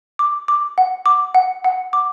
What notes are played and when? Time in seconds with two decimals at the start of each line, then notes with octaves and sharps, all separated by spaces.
0.19 D6
0.48 D6
0.78 F#5
1.06 D6
1.35 F#5
1.64 F#5
1.93 D6